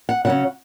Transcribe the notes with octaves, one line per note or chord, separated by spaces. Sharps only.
F#5
C#3 F#3 C#4 F#5